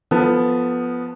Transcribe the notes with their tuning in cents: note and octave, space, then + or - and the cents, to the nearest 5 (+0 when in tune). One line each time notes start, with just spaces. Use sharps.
F3 +0 B3 +0 A4 +20